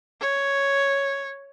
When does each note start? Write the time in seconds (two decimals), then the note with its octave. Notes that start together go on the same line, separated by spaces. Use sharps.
0.21 C#5